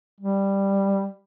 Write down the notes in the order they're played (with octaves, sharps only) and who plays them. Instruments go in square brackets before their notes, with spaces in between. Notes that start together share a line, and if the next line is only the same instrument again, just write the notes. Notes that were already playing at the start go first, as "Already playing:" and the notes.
[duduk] G3